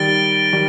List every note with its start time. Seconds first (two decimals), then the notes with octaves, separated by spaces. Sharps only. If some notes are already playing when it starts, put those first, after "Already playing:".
Already playing: D#3 G3 A6 D7 G7
0.53 D#3 G3